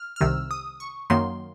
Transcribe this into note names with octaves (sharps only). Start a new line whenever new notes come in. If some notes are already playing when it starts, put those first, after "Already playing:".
Already playing: F6
F6
C2 C3 D#3 E6
D#6
C#6
F#2 D#3 F#3 A#3 C6